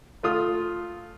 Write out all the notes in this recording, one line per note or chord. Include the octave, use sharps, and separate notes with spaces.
A3 F4 D#6